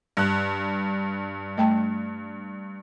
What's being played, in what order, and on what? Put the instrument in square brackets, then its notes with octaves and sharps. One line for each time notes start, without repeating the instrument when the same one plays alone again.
[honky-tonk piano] G2 F#6
[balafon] A3 G5 A5